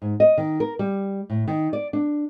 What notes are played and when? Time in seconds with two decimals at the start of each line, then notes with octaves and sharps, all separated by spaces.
0.02 G#2
0.20 D#5
0.38 D#3
0.60 A#4
0.79 G3
1.30 A2
1.48 D#3
1.73 D5
1.93 D4